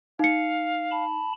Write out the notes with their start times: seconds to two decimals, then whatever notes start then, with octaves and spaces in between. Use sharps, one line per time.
0.19 D#4 F5 C#7
0.91 A5 B5